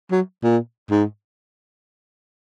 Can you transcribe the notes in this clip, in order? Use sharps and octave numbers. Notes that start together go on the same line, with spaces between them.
F#3
A#2
G#2